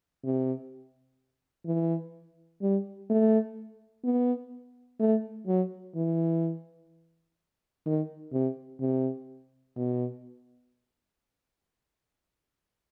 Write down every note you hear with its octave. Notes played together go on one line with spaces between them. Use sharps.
C3
E3
G3
A3
B3
A3
F#3
E3
D#3
C3
C3
B2